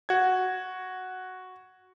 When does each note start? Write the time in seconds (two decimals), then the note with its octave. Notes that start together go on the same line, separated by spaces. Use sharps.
0.09 F#4 G#6